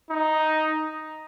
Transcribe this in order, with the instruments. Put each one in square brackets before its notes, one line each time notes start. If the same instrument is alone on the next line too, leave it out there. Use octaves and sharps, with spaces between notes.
[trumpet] D#4